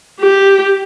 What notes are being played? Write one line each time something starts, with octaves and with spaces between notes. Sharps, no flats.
G4